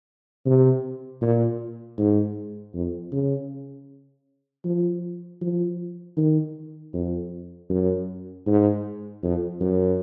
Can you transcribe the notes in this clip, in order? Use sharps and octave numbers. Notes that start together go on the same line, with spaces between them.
C3
A#2
G#2
F2
C#3
F3
F3
D#3
F2
F#2
G#2
F2
F#2